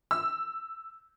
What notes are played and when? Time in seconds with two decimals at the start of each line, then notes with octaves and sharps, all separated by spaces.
0.11 E6